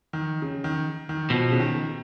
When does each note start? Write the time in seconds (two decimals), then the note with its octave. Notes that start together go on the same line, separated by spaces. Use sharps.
0.13 D#3
0.42 C#3
0.64 D#3
1.09 D#3
1.30 B2 F3
1.51 C#3
1.60 D#3